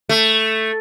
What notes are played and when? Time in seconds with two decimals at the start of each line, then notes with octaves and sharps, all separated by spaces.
0.09 A3